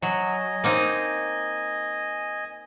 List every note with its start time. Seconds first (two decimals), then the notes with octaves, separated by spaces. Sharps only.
0.02 F#3 D#5 G#5
0.64 A#3 C4 D#4